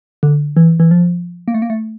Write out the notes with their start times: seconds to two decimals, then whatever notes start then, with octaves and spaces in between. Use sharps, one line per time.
0.23 D3
0.57 E3
0.80 E3
0.91 F3
1.48 A#3
1.54 A3
1.62 A#3
1.70 A3